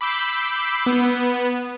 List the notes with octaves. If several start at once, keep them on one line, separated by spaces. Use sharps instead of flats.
B5 D6 E6 G6 C7
B3